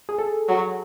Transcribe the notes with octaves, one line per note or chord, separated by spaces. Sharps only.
G#4
A4
F#3